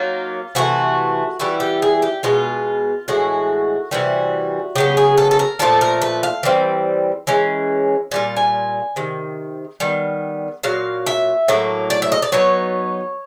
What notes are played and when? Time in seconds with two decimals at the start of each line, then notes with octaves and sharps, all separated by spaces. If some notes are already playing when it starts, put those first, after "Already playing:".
Already playing: F#3 A#3 D#4 F4
0.55 C3 E3 A3 F#4
1.39 E3 G3 B3 E4 F#4
1.60 G4
1.82 G#4
2.02 G4
2.23 B2 G#3 B3 F4
3.08 A2 E3 G#3 F#4
3.91 C3 E3 G3 F#4
4.75 C#3 F#3 B3 G4
4.97 G#4
5.17 A4
5.31 A4
5.39 A#4
5.59 A#2 F3 A3 A4
5.81 A#4
6.02 B4
6.23 F5
6.43 E3 G3 C4
7.27 E3 G#3 C#4
8.11 A#2 G3 F4 G#5
8.37 G#5
8.96 C3 D#3
9.80 D#3 G3 B3
10.63 A#2 F#3 F5
11.06 E5
11.48 A2 F#3 A#3
11.90 D5
12.02 E5
12.12 D#5
12.22 D5
12.32 F#3 B3 D#4 C#5